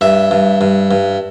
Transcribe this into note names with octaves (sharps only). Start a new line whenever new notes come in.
G2 E5
G2
G2
G2